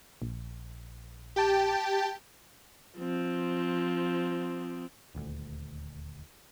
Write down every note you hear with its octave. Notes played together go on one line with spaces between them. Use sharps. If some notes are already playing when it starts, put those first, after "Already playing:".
A#1
G4 G5 A5
F3 C4
D#1 D2